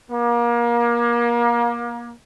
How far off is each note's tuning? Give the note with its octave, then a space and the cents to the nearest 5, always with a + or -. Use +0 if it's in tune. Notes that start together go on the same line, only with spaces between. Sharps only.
A#3 +30